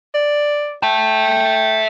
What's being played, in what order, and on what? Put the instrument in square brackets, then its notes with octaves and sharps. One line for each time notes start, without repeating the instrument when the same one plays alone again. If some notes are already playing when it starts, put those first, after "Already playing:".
[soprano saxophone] D5
[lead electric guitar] E5 A5 [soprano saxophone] G5